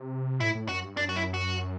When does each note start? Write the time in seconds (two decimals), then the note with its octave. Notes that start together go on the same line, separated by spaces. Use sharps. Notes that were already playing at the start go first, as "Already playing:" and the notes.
Already playing: C3
0.40 A2 E4
0.55 A2
0.68 F#2 F#4
0.83 G2
0.97 F#2 D4
1.09 F#4
1.16 E4
1.34 F#4